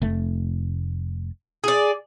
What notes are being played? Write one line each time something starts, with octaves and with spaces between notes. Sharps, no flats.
F1 A3
G#4 D5